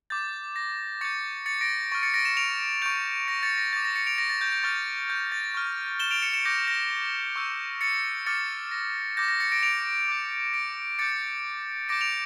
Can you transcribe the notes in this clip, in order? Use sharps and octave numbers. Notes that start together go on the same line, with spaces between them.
D6 G6 A6
A#6
C#6 G6 A6 C#7
A6 C#7
A#6 D7
C#6 F6 A6
A6 C#7
A#6 D7
C#7 E7
D7 F7
C#6 G6 D7 F7
A#6 D7
A6 C#7
A#6
D6 G6 A6
A#6
A6 C#7
D7 F7
A#6 D7
A6
G6
G6
C#6 F6 A6
G6
A6
C#6 F6
E7 G7
D7 F7
C#7 E7
C#7 E7
D6 G6 A#6 D7
A#6
C#6 E6 G6
A6 C#7
D6 F6 A6 C#7
A#6
D6 G6 A#6
A#6
A6 C#7
A#6 D7
D7 F7
D6 G6
A#6 D7
D6 G6 A6 C#7
D6 G6 A#6 D7
D7 F7